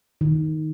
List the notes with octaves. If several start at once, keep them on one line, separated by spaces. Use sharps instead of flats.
D#3